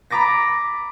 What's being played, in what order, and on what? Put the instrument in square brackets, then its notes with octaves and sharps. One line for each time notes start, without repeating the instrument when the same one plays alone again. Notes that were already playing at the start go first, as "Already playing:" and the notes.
[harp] A#5 B5 D6 A6 A#6